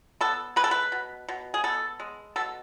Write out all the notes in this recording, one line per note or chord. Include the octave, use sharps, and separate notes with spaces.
B3 A4
G#3 B4
A4
B4
B2
B2
G#4
B3 A4
G#3
B2 A4